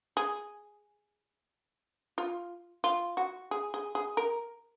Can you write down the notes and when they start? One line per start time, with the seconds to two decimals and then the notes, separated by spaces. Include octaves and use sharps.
0.17 G#4
2.18 F4
2.84 F4
3.17 F#4
3.51 G#4
3.74 G#4
3.95 G#4
4.17 A#4